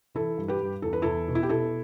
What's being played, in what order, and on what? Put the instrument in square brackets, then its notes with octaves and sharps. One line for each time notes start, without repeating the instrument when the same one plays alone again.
[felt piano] E3 E4 A4
G2
G4 B4
G2
E2 A4
B4
E2 E4 A4
B2
E4
G4
B2 E4 A4